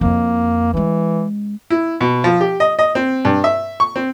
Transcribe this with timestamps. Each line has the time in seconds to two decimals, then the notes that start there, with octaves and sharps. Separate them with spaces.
0.01 F2 A#3 E4
0.74 E3 G#3 C#4
1.70 E4
2.01 B2
2.24 F3
2.41 G4
2.60 D#5
2.79 D#5
2.95 C4
3.25 G2
3.44 E5
3.80 C#6
3.96 C4